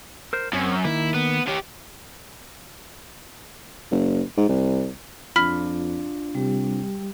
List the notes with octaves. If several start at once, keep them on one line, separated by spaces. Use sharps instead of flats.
A#4 C5
F#2 C4 C#5
D#3 A#3 E4
B3
G4 C#5
F#1
G#2
C2
F2 D4 F4 B5 F6 B6
C3 G3 G4